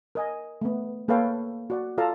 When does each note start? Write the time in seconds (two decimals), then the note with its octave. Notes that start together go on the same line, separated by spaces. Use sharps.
0.15 A#4 D#5 G#5
0.62 A3 B3
1.08 A#3 A4 B4 C#5 F5 G5
1.70 F#4 D5 F#5
1.98 F4 A4 D5 F5 A5 A#5